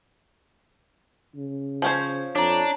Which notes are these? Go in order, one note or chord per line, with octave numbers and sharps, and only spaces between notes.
C#3
F3 C#4 C5
F2 D4 C#5 A#5